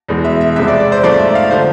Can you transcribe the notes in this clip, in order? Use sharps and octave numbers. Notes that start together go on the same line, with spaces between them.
E2 B2 G#3
E5
E5
F2 C3 F3 G#3 E5
D5
D5
C5
G#2 F3 A3 D5
E5
F5
D3 F3 C5